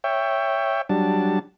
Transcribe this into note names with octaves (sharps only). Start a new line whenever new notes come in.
C#5 E5 G5
F#3 G3 D4 A5